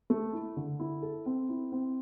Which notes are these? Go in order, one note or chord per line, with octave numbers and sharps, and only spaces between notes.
A3
E4
D3
E4
A4
C4
E4
C4